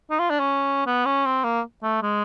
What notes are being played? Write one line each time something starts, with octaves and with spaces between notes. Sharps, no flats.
D#4
F4
D4
C#4
B3
C#4
C4
A#3
A3
G#3